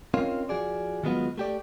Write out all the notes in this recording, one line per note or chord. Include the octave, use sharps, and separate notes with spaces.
C4 C#4 D#4 F4 A#4 C#5
F3 F#4 G#4 D5
D#3 F#3 G#3 B3 F4 F#4
A3 G4 D5